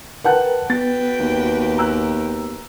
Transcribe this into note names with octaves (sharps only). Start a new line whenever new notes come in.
A#4 B4 F#5 G5 A5 F#6
B3 F#4 B4 G5 A6
D#2
A#5 E6 F#6